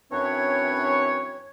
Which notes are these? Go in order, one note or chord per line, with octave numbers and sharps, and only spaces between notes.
F#2 E3 C4 D4 B4 C#5